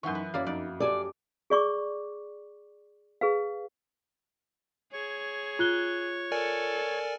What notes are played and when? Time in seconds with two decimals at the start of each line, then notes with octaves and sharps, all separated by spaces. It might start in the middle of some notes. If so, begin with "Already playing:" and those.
0.03 F#2 E3 D#4 F#5 C6 C#6
0.15 B4
0.34 F#2 A#3 E4 C#5 D5 F5
0.46 F2 D#4 D5
0.80 G4 A4 D5 G#5 A5
1.50 G#4 D5 C#6 D6
3.21 G#4 B4 F5
4.93 G#4 C#5
5.59 F4 F#6 G7
6.32 A4 A#4 D5 G#5